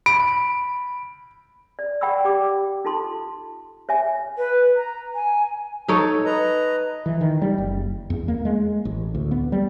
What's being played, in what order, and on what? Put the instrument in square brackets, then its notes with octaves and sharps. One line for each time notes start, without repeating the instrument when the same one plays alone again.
[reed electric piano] B5 [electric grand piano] D7
[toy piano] D5
D5 F#5 G5 B5 C#6 E6
G4 D5 G5 D6
D#4 F4 A4 A5 C6
C#5 E5 G#5
[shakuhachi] B4
A#5
G#5
[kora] D#4 A4 C#5
[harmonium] B4 D#5 A#5
[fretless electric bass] E3
D#3
G3
F#1
E2
A#3
G#3
A1
D2
B3
G3